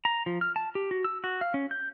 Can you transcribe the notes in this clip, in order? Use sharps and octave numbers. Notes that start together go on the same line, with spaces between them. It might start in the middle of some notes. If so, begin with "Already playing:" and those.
A#5
F3
F6
A5
G4
F#4
E6
F#4
F5
C#4
G6